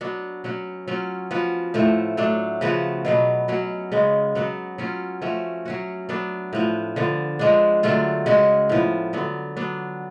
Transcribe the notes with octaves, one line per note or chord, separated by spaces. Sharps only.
F#3 B3 D4 F#4
F#3 C#4 F#4
F#3 C#4 F4
F3 B3 F#4
A2 F3 A3
F#3 A3 D4
C#3 F3 B3 F#4
B2 F#3 B3
F#3 C#4 F#4
C#3 G#3 B3
F#3 B3 F#4
F#3 C#4 F4
F3 A3 C#4 F#4
F#3 C#4 F#4
F#3 B3 D4
A2 F3 B3
D3 F3 B3
F3 G#3 D4
D3 F#3 A3 F4
C#3 G#3 C#4 F#4
A2 F3 B3
D3 F#3 B3
F#3 B3 D4